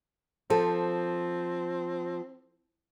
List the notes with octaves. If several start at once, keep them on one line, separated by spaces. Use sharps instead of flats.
F3 C4 A4